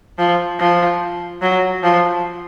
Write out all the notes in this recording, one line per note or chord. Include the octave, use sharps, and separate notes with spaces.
F3
F3
F#3
F3